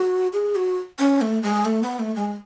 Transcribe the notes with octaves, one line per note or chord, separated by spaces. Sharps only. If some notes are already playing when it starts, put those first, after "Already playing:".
Already playing: F#4
G#4
F#4
C#4
A3
G#3
A3
B3
A3
G#3